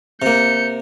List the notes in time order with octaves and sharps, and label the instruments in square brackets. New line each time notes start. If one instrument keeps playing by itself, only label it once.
[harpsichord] C3 A#3 [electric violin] G6 C#7